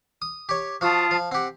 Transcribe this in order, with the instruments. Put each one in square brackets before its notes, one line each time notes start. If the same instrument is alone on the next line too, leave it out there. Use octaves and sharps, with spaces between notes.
[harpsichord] D#6
G4 C#5
[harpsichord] F3 F#4 [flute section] F4 A5 D#6
[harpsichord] F3
[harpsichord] C4 G4 [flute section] F#5